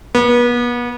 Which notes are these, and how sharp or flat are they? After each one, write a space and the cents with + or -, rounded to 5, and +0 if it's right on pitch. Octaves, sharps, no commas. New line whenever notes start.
B3 -35